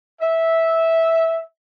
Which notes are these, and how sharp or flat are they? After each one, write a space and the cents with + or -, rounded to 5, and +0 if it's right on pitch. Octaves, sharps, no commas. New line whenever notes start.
E5 -10